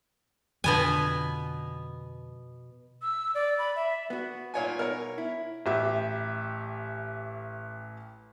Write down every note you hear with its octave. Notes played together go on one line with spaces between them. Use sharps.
F2 B2 D3 B3 G#5
E6
D5
B5
E5
B3 F#4
A#2 C#5 G#5
B2 A#4 C#5
E4
A1 G4 E5